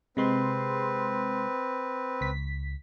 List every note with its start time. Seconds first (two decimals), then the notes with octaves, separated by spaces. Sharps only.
0.17 C3 G#3 C4 B4 C6
2.21 C#2 B6